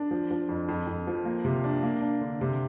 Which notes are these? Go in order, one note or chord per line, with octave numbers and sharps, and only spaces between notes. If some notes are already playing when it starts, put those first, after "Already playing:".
Already playing: D4
F3
F3
F2
F2
F2
F3
A#3
C3
D4
A#3
D4
D3
C3